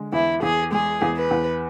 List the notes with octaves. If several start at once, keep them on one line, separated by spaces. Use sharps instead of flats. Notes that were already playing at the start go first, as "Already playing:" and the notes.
Already playing: D3 G#3
E2 E4
E2 G#4
G#3 G#4
E2
B4
E2